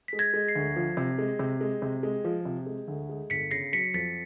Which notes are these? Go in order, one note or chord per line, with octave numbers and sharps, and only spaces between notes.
G#3 B6
G#6 A#6
G#3
A#6 C7
D2
F3
C3
G#3
C3
G#3
C3
G#3
F3
C3
G#3
D2
G#3
G1 B6 C#7
C#3 A#6 C7
F#3 B6 C#7
F2 A6 B6